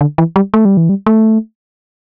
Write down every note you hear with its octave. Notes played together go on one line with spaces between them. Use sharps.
D3
E3
G3
A3
G3
E3
G3
A3